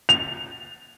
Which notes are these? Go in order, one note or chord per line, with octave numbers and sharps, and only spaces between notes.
F7